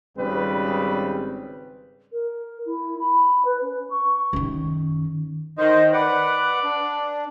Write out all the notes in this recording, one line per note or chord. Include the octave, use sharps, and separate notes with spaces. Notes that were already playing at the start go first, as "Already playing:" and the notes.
G#1 C#3 G3 C4 B4
A#4
E4
B5
B4
C#4
C#6
F#2 D#3
D#3 C5 D#5
B4 D5 F#5
D4